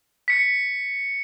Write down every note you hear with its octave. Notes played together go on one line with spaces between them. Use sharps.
B6 C#7